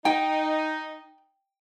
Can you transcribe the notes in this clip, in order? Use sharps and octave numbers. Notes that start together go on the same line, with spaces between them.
D#4 G5